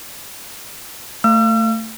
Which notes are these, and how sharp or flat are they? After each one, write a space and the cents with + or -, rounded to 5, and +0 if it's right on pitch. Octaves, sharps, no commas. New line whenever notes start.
A3 +20 F5 -20 E6 +45